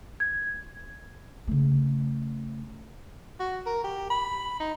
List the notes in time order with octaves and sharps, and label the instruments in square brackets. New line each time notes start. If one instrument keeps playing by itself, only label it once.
[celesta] G#6
[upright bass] C#3 A3
[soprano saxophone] F#4
A#4
G4
B5
D#4